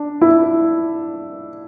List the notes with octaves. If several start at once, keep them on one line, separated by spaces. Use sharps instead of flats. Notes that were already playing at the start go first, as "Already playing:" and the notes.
Already playing: D4
E4